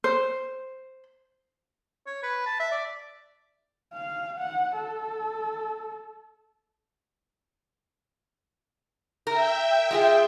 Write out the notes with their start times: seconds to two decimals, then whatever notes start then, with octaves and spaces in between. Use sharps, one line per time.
0.04 C5
2.06 C#5
2.23 B4
2.46 A5
2.60 E5
2.71 D5
3.93 F5
4.38 F#5
4.77 A4
9.27 A#4 E5 G5
9.91 G#3 F4 G#4